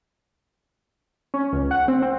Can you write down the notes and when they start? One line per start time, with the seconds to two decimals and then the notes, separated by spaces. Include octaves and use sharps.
1.34 C#4
1.53 C#2
1.71 F#5
1.88 C4
2.02 C4